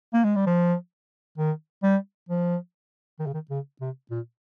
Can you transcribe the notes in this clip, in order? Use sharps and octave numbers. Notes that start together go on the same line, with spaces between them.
A#3
G#3
G3
F3
D#3
G3
F3
D#3
C#3
D#3
C#3
C3
A#2